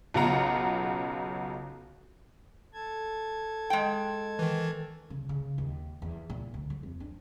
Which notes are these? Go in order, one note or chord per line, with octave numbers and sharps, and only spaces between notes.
B1 C#3 F4 F#5 A#5
A4 A5 G#6
G#3 G5
D#3 E3
C#3
C#3
D#2
E2
A#2
D2
F#3
F2
D4